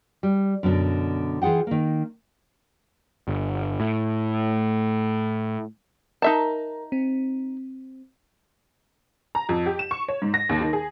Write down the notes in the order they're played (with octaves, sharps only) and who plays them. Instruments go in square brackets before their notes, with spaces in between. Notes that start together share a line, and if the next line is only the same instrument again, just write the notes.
[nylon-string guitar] G3
F#2 B2 D3
E3 F4 G#4 F#5 G5
D#3 A#3
[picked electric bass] G1
A2
[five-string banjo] D#4 E5 A5 [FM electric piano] A#4 A#5
[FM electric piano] C4
[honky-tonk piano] A#5
F2
G4
E7
C#6
C#5
G#2
A#6
D#2
D#3
G#4